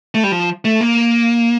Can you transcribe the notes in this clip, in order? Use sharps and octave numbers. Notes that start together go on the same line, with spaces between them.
A3
G3
F3
A3
A#3